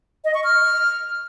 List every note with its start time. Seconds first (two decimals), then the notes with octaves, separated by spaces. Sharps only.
0.25 D#5
0.34 C#6
0.44 F6